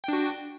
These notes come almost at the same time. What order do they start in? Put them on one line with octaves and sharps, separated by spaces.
G5 D4 F#4